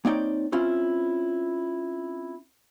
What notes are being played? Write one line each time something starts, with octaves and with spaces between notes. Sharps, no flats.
A#3 C4 D#4 C#5 D5 G5
C4 C#4 E4 F4